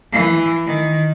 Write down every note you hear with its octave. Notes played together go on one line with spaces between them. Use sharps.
E3
D#3